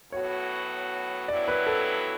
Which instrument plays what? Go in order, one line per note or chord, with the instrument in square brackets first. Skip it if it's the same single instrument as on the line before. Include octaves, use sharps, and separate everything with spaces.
[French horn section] A2 F#3 B3 F#4 [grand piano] C#5
[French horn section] G2 F#3 B3 E4 [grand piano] D5
[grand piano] B4
A4